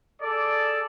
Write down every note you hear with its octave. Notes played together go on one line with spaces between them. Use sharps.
G#4 A4 D5